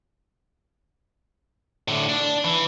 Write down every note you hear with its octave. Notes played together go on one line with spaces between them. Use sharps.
A2 D3
D4
E3